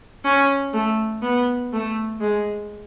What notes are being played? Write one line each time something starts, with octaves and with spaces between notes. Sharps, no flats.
C#4
A3
B3
A3
G#3